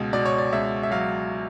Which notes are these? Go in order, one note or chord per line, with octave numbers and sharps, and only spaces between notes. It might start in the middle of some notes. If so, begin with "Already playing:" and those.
Already playing: C#2 B2
B2 D5
C#5
D5
C#2 E5
E5
F#3 F5